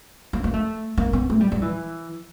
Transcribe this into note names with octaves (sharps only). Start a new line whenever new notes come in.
A#3
A#3
A3
A#3
B3
A3
G3
G3
E3